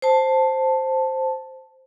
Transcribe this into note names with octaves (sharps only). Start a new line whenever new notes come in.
C5 A5